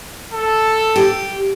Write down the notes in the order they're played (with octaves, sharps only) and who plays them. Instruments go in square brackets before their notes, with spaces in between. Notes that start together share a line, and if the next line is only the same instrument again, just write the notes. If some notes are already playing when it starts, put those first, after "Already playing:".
[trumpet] A4
[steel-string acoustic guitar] G4